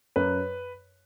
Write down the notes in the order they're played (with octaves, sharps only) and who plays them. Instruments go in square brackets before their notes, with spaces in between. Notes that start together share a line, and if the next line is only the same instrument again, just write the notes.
[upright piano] F#2 B4